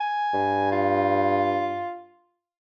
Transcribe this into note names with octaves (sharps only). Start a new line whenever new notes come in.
G#5
G2
F4